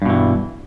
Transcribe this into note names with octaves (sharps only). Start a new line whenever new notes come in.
G2 B2 E3